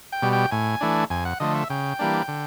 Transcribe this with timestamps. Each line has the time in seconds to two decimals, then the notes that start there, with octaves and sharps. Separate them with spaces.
0.12 G5
0.22 B2 G3
0.33 G5
0.51 A2 G#5
0.81 E3 A3 D4
1.10 F2 G#5
1.25 F#5
1.40 D3 F3 A3 D#5
1.55 E5
1.70 C#3 G5
1.99 E3 G3 A#3 D4
2.28 D3